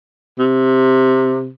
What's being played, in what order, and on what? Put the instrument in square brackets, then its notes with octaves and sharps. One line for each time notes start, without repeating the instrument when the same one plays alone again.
[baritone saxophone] C3